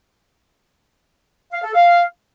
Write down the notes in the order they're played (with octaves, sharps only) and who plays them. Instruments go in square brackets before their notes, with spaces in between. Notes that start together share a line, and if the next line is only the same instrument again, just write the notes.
[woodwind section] F5
A4
F5